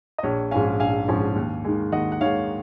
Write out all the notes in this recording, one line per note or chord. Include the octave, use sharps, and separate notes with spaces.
D#5
A#1 C#5
G#2 F3 G#3 C#4 F5 G#5
A#1 F5 G#5
G#2 F3 G#3 C#4
D#2
D#3 G#3
D#2 D#5 F#5
F#5
D#3 G#3 C#5 F5